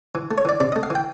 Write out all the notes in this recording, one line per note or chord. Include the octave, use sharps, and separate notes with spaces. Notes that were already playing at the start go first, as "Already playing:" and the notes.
E3
A3
C#5
E3 D5
C3 D5
D#5
A3
F5
E3 G5